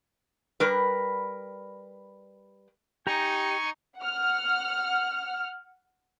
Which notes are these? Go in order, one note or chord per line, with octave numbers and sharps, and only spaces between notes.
G3 A#4 B4
D#4 G4 G#5 A#5 C#6
F#5 F6